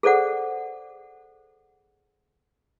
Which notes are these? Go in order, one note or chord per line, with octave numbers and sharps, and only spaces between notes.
G#4 A4 C5 D5 F#5